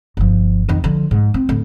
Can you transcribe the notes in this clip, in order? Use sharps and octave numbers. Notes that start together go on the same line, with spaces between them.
G1 F3
F2 D#3
D3 F3
G#2
C4
D1 D3